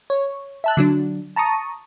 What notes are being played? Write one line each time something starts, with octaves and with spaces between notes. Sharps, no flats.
C#5
E5 A5 F#6
D3 F#3 D4
A5 A#5 C#6 D#6